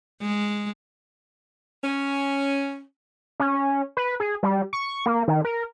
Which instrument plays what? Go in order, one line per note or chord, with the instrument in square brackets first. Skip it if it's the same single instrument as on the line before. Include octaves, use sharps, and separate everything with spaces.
[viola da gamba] G#3
[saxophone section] C#4
[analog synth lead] C#4
B4
G#4
G3
C#6
A#3
D#3
A#4